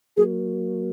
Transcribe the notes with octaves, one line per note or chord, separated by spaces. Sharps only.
F#3 A#3 G#4